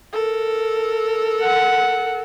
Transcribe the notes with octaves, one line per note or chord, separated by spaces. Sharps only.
A4 A#4
F#5